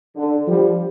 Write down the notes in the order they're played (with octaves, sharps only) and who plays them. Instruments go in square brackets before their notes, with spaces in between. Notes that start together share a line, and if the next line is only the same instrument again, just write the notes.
[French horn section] D3
[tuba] F3 [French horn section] G3